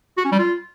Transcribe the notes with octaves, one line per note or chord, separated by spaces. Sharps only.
F#4
C#4
G3
F4